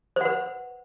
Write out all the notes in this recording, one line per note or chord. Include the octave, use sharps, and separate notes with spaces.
B4 C5 F#5